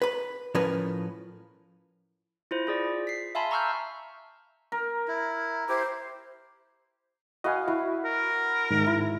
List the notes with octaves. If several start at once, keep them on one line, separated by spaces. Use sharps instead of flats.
B4 B5
A2 F3 C#4 A#4 B4
E4 F4 C5
F4 G#4 D5
B6 C7
E5 F5 G#5 A5 B5 C6
A#5 C#6 E6 F6 G6
A#4
E4
E4 G4 C5
F#4 B4 D#5 F5 G#5
E4 F#4
A#4
G#2 D#3
E4